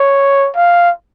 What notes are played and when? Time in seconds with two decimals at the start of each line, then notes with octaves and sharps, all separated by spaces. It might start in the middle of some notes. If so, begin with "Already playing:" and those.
Already playing: C#5
0.56 F5